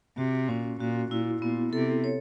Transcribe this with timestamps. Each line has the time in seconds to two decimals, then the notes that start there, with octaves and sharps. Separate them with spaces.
0.18 C3 F#4
0.49 A#2 C#4
0.80 A#2 F#4
1.11 A#2 E4
1.42 A#2 B3
1.73 C3 A4
2.04 C#5